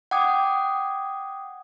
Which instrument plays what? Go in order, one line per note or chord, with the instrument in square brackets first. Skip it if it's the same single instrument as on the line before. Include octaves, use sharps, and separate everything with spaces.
[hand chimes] F#5 G5 D6 D#6 G#6